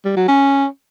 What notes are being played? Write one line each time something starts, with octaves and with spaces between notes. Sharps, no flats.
G3
F#3
C#4